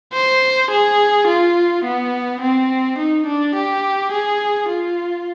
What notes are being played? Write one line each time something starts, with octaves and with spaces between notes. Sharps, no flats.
C5
G#4
F4
B3
C4
D#4
D4
G4
G#4
F4